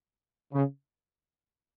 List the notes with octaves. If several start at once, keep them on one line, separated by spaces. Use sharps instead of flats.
C#3